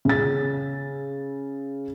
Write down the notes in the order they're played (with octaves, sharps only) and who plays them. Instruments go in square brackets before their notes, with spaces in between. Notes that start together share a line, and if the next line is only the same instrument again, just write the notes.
[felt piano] C#3 A6